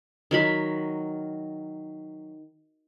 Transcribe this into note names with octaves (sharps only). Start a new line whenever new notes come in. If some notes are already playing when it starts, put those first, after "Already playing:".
D#3 F#3 B5